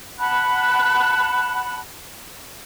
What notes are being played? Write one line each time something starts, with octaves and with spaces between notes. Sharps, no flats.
F#5 A5 B5 F#6